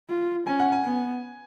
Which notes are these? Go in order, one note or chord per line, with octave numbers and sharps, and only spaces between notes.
F4
C#4 G#5
F#5
G#5
B3